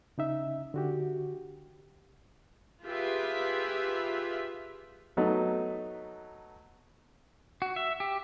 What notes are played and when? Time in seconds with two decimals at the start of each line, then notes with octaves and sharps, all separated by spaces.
0.18 C#3 D#4 E5
0.74 D3 F#4 G4
2.85 F4 G4 G#4 B4 E5
5.17 F#3 A3 B3 D#4
7.62 F#4
7.76 E5
8.00 G4